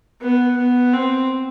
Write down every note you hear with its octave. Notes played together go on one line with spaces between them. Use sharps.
B3
B3
C4